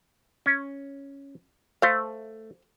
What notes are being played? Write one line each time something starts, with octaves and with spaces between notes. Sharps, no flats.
C#4
A3 C5 F5